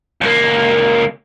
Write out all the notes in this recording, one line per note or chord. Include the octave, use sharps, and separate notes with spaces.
C#2 A#3